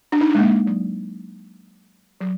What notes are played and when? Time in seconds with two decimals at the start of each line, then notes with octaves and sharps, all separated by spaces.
0.12 D4
0.21 D#4
0.30 D4
0.35 G#3
0.39 A#3
0.67 F#3
2.21 F#3